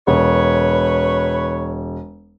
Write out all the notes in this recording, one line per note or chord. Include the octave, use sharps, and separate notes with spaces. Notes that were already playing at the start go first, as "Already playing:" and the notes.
E1 B4 C#5